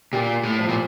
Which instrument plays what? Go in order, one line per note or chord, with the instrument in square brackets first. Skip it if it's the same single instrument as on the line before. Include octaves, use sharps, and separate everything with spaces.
[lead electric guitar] A#2 [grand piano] G4
[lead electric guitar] A2
[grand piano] F3
[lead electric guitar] A#2